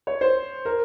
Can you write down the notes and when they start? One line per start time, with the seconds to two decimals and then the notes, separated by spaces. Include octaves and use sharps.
0.07 C#5
0.21 C5
0.65 A#4